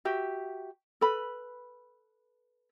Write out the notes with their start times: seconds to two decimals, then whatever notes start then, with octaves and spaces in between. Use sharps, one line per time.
0.05 F#4 G4 E5
1.01 A4 B4 B5